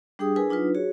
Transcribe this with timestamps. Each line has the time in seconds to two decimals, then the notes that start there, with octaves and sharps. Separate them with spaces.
0.19 G3 D4 G4 G#4 G5 D#6
0.36 D4 E4 G#4 A#4 B4 G#5
0.49 F#3 D4 D#4 F4 B4
0.75 F#4 G#4 C#5